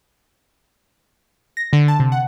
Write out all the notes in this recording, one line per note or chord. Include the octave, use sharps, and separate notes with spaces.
A#6
D3
A5
C3
F#5